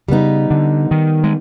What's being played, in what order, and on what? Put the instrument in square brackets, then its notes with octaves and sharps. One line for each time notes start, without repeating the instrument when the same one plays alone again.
[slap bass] C#3 [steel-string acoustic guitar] G3 B3 D#4
[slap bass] D3
D#3
G#3